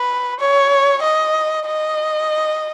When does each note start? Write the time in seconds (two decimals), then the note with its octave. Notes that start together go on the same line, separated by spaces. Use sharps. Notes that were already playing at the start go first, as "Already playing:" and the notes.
Already playing: B4
0.40 C#5
1.03 D#5
1.66 D#5